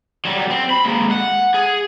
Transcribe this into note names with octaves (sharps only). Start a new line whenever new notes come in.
F#3 G3
C4
B5
G#3 A#3
F#5
G#4